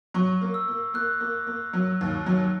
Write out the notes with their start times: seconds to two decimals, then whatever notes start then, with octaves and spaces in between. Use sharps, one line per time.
0.14 F#3 C#6
0.41 A#3
0.54 E6
0.68 A#3
0.94 A#3 F#6
1.20 A#3
1.47 A#3
1.73 F#3
2.01 D#2
2.26 F#3